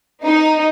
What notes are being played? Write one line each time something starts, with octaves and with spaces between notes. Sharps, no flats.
D#4